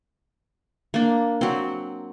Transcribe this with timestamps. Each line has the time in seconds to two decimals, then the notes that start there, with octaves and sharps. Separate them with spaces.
0.94 A#3 D4
1.41 F#3 C4